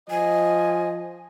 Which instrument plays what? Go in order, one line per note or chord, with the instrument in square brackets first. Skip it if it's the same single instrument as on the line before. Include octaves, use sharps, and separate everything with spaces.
[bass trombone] F3 [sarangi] D#5 [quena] G#5